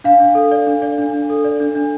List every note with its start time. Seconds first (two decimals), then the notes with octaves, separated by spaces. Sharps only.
0.04 D4 F5
0.20 D4
0.35 A4
0.52 D5
0.67 D4
0.82 D5
0.98 D4
1.13 D4
1.30 A4
1.44 D5
1.60 D4
1.75 D4